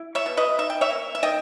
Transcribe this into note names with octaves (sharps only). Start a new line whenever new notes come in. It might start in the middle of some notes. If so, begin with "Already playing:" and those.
Already playing: E4
C#5 E5
B2
B4 D#5
D#4 E5
G5
C#5 E5
A#3
E5
D#3 D#5 G5